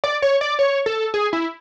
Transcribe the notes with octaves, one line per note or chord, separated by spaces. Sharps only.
D5
C#5
D5
C#5
A4
G#4
E4